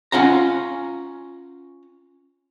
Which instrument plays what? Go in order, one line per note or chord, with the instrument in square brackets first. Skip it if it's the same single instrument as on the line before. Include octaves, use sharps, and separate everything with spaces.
[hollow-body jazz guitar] C#4 F4 F#5 A#5